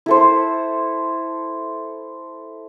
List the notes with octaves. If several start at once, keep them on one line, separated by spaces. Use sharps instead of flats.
E4 A4 C5